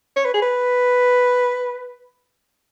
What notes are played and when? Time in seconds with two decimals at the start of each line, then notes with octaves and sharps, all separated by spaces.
0.16 C#5
0.25 B4
0.34 G#4
0.42 B4